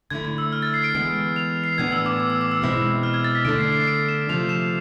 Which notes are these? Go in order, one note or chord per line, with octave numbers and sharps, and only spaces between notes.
D3 A3 E4 G#6
G#6
E6
F6
A6
C7
D7
E3 G#3 B3
F7
C7
A2 E3 B3 D4 G#6
E6
D6
D6
E6
D6
E6
B2 G#3 C4 E4
F6
G#6
A6
B6
D3 A3 D4 D7
C7
C7
D7
E7
C3 F3 A3 F7
E7